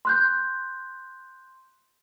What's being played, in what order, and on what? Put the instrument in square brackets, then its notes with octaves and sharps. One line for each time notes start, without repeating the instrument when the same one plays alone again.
[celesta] C6 F#6 G6